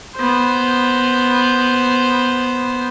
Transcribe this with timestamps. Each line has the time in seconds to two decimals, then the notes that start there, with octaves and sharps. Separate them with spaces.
0.16 B3 C5